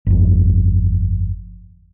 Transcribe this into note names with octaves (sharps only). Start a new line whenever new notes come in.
G1 F2